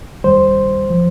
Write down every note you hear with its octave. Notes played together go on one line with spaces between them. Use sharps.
D#2 D#3 G3 C5
F3